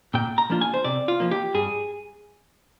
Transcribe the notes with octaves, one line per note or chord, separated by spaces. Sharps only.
A#2 G5
A#5
F3 A#3 D4 F4
G#5
C5
C3 D5
F4
F3 A#3
G4
G2 G#4